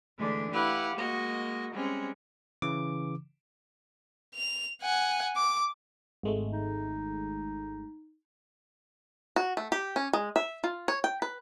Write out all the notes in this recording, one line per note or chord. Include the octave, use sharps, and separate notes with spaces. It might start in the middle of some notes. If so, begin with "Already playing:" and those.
D3 E3 G#3 A3 D4
E4 G4 B4 F5 F#5
G#3 A#3 F#4 D#5
G3 G#3 C4 C#4
C#3 E3 D6
F7
F#5 G#5
D6
G#1 G#3 A3
D#4
F#4
A3
G4
C#4
G#3
E5
F4
C#5
G5
B4